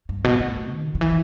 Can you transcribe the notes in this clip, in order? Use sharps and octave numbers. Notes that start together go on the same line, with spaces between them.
G2
B2
A2
D#3
D#3
E3